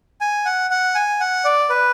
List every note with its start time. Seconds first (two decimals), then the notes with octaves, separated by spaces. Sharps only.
0.21 G#5
0.45 F#5
0.70 F#5
0.95 G#5
1.20 F#5
1.45 D5
1.70 B4